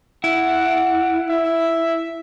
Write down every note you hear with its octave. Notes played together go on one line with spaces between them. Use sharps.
E4 F#5
E5